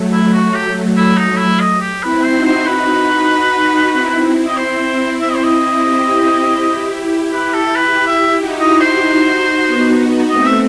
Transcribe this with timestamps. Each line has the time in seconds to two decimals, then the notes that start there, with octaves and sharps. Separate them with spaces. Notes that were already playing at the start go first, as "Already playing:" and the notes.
Already playing: F#3 A3
0.13 E4
0.33 F#4
0.54 G4
0.75 F#3 A3
0.97 E4
1.07 F#3 A3
1.18 D#4
1.39 E4
1.60 D#5
1.81 G4
2.03 C4 E4 B4
2.24 C5
2.34 D#4 F#4
2.45 C5
2.66 B4
3.30 D#4 F#4
3.93 C4 E4
4.47 D#5
4.57 C4 E4 C5
5.21 E5
5.29 D#5
5.36 C5
5.44 D#5
5.84 E4 G4
7.33 B4
7.54 A4
7.75 E4 G4 B4
8.07 E5
8.39 D#4 F#4
8.60 D#5
8.81 C5
9.02 D#4 F#4
9.67 B3 D#4
10.30 A3 C4 D#5
10.46 E5